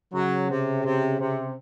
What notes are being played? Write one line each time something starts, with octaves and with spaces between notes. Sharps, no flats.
C#3 F#3
C3
C3
C3